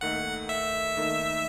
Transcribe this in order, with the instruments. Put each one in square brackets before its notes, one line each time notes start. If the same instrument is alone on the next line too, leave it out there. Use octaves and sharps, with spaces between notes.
[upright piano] D#2 D#3 A3 D#4 A4 [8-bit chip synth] F#5
[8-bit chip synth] E5
[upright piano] D#2 D#3 A3 D#4 A4